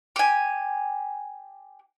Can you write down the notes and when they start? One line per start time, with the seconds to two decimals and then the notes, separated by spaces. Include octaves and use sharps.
0.16 G4 G#5